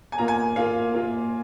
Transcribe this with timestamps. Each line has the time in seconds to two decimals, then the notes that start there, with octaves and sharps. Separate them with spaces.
0.12 G#5
0.18 A#2 A#3 F4 A#5
0.28 G#5
0.56 A#2 A#3 F4 F5
0.94 A#2 A#3 F4